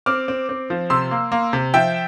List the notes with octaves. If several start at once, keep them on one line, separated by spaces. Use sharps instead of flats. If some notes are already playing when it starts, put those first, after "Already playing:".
C4 D6 F6
C4
C4
F3
C3 C6 E6
A#3
A#3
C3
F3 E5 G5